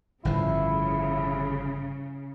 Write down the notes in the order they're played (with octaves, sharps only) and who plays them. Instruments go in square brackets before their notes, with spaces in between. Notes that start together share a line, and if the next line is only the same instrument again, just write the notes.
[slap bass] G1 A2 F3 [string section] C#3 [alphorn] E4